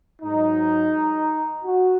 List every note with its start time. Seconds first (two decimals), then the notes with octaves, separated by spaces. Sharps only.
0.22 G#2 F#3 D#4
1.63 F#4